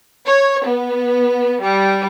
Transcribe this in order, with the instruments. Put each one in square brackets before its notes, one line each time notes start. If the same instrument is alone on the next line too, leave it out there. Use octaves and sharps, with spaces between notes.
[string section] C#5
B3
G3